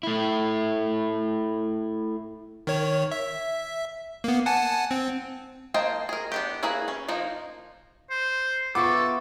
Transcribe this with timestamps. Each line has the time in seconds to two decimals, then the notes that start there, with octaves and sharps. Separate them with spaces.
0.03 A3 E4
2.67 D#3 C#5
3.11 E5
4.24 A#3 B3
4.46 F#5 G#5 A5
4.91 C4
5.74 A#3 C5 D#5 G5 A5
6.09 G#4 A#4
6.32 B3 D4 G4
6.63 A#3 E4 G#4 A#4 B4
6.88 C#4
7.08 F3 A#3 D#4
8.10 C5
8.75 B3 F4 A4 E5 C#6 D6